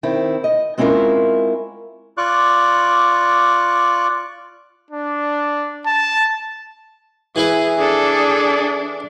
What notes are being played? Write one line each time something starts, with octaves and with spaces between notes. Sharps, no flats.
D#3 C4 E4
D#5
G#3 C4 C#4 E4 F4 A#4
F4 D5 C#6 D6 F#6
D4
A5
E3 E4 G#4 B4
D4 G#4 A4